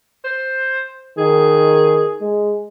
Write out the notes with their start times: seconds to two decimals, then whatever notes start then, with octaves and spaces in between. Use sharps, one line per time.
0.24 C5
1.18 D#3 G#4
2.21 G#3